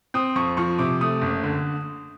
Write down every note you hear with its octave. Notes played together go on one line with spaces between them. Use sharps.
C4 D#6
F2 C#6
F3 C#6
C3 D6
A3 D#6
F#1
D3